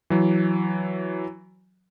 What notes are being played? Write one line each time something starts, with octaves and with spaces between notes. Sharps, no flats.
E3 F#3